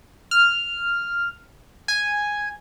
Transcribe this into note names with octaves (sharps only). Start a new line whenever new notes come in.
F6
G#5